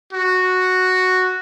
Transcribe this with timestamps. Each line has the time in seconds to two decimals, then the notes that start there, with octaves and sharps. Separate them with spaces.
0.13 F#4